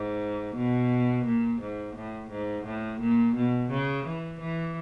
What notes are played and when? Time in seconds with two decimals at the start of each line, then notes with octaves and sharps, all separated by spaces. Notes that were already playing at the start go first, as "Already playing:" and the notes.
Already playing: G#2
0.55 B2
1.25 A#2
1.61 G#2
1.95 A2
2.30 G#2
2.65 A2
3.00 A#2
3.35 B2
3.70 C#3
4.05 E3
4.40 E3